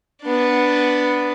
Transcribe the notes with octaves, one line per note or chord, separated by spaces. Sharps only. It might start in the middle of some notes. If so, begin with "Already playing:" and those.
B3 D4